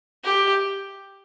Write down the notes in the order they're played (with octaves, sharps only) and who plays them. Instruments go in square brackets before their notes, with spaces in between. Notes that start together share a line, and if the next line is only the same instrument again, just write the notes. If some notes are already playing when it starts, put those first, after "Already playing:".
[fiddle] G4